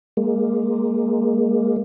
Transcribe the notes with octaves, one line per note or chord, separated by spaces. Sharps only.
G#3 A#3